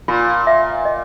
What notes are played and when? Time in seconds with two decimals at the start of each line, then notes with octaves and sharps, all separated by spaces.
0.08 A#2 F4
0.47 E5
0.85 D#5